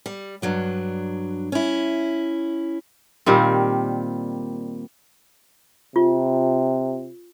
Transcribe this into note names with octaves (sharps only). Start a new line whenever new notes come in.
G3
G2 F#3 D4
C#4 E4
A#2 D#3 G3 C4
C3 F4